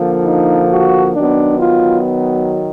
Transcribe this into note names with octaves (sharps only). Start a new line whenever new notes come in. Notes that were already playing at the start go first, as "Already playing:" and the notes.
Already playing: D3 F3 A#3
D#4
F#4
D#3 F#3 B3 D4
F4